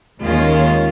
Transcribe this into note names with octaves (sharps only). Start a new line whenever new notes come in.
D#2 D#3 G#3 C#4 F4